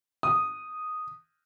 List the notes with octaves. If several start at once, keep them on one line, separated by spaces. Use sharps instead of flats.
D#6